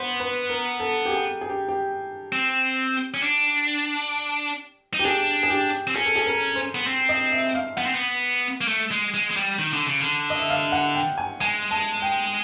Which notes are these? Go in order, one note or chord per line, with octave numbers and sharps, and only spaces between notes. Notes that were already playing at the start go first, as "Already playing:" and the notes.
Already playing: B3 C5
B4
A#4
A4
G4
G#4
G#4
G4
G4
C4
C#4
D4
D#4
G4
D4 G#4
G#4
G4
C4
C#4 G#4
A4
G#4
A#4
C5
B3
C4
D#5
E5
F5
B3 F#5
C4
B3
A#3
A3
G#3
G#3
G#3
G3
D#3
D3
C#3
D3
D#5
E5
F5
F#5
G5
G#5
G#3 G#5
A5
G5